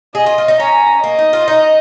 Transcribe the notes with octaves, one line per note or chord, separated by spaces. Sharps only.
G#4 D#5
F4
F4
D#4
C#4 A#5
A#3 D#5
D#4
F4
D#4